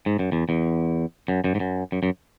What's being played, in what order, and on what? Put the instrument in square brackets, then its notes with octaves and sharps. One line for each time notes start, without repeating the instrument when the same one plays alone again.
[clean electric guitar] G#2
F#2
E2
E2
F#2
F#2
G#2
F#2
F#2
F#2